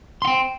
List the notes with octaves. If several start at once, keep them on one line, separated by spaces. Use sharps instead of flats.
F#5 G5 C6